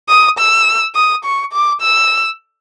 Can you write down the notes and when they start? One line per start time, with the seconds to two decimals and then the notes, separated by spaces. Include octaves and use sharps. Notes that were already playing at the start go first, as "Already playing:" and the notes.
0.09 D#6
0.39 E6
0.95 D#6
1.25 C#6
1.53 D6
1.81 E6